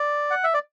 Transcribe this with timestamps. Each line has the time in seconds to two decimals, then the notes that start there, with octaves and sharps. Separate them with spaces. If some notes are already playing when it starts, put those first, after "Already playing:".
Already playing: D5
0.31 F#5
0.44 E5
0.54 D5